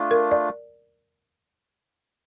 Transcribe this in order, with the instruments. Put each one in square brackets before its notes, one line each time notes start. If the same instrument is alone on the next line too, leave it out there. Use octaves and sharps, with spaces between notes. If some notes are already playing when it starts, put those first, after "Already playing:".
Already playing: [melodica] A3 D4 F4
[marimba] A#4
D5